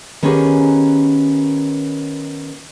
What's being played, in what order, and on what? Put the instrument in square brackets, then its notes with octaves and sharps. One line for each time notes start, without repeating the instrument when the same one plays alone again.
[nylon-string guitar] D#3 B3 C#4 G4 G#4